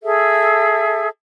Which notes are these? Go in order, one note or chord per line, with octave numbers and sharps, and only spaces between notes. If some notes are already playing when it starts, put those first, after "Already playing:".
G#4 A4 E5